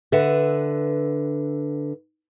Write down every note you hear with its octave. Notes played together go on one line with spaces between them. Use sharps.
D3 B4 E5 F#5